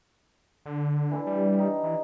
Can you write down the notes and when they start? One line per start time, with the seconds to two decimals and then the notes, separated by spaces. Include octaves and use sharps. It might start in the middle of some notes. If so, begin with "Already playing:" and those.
0.66 D3
1.11 E3 D4 E4
1.27 G3
1.54 D#4 G4
1.83 E3